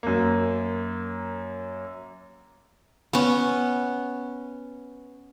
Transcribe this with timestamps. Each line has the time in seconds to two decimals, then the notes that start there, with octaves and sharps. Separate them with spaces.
0.03 F#2 A#3
3.13 B3 C#4